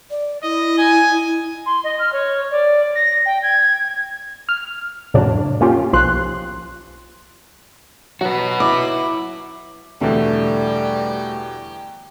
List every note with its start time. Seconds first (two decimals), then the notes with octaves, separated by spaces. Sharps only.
0.10 D5
0.43 E4 D#5
0.78 G#5
1.66 C6
1.84 D#5
1.99 F6
2.13 C#5
2.51 D5
2.95 A#6
3.26 G5
3.43 G#6
4.49 F6
5.14 F2 A2 C#3 F#3 D4
5.61 A#3 C#4 F4 G4
5.93 B1 F3 C6 F#6
8.21 F#3 F#4 B4
8.60 E4 D6
10.01 E2 B2 D3 G3 A3 G4